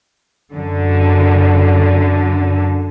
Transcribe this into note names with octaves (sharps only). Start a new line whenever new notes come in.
F#2 D3